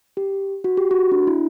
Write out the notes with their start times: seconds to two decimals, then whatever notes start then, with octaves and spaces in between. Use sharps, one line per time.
0.17 G4
0.64 F#4
0.77 G4
0.91 F#4
1.12 D4
1.27 E4